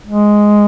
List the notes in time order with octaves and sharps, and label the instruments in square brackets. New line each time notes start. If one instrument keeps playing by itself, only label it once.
[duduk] G#3